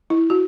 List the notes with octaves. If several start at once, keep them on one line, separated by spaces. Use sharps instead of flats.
E4
F#4